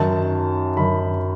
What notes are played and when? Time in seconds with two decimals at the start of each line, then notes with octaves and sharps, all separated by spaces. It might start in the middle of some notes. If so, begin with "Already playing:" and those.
Already playing: F#2 D#3 A5
0.77 F#2 D#3 B5